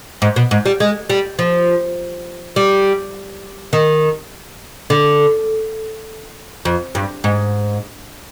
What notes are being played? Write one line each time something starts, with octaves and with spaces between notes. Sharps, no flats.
G#2
B2
G#2
G3
G#3
G3
F3
G3
D#3
D3
F2
G2
G#2